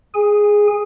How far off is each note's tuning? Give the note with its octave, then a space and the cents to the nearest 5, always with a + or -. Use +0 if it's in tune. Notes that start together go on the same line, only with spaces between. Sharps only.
G#4 +0 G#5 -25